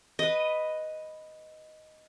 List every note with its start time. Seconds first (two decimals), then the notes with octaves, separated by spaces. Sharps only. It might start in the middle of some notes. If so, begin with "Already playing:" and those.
0.19 B4 D#5